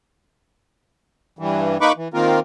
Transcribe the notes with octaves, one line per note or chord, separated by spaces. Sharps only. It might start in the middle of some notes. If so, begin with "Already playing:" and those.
G2 E3
A#3 D#4 B4 B5 C#6 D6
E3
D#3 A#3 C4 F4 A#4